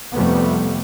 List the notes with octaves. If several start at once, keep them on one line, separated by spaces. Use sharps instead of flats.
F2 C3 G3 A3 B3